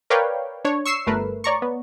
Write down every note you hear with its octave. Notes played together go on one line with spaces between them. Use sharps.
A#4 B4 C#5 D5 F5 G5
D4 C#5
C#6 E6 C7 E7
G1 A3 A#4 B4
C#5 D5 A#5 C#6
B3